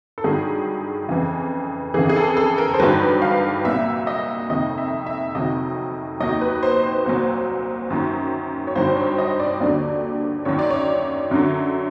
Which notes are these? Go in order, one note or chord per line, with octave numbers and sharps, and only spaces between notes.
A4
G2 D#3 F#3 G#4
F2 C#3 E3
F2 C#3 E3 G#4
G#4
A4
A4
A#4
C5
G2 D#3 F#3 B4
F5
C2 A#2 F#3 E5
D#5
F2 C3 D#3 D#5
E5
E5
F2 C3 D#3 F#3 D#5
D#2 D#3 F#3 D#5
B4
C5
C5
C2 A#2 F#3
F#2 D#3 F#3
C#5
G2 D#3 F#3 C5
C#5
D#5
D5
D#2 D3 F#3 D5
F#2 D#3 F#3 C#5
D5
C#5
F#2 D3 F#3